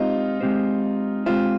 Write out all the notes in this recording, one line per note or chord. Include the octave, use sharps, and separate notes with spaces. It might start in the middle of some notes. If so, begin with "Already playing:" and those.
Already playing: G#3 C4 D#4 F4 G4 C5
G#3 C4 G4 C5
G#3 C4 F4 G4 C5